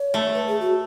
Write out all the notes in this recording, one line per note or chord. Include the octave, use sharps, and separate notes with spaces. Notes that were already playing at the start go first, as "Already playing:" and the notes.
Already playing: C#5
A3
B4
G#4
F#4